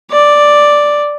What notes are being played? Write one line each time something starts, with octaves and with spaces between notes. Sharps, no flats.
D5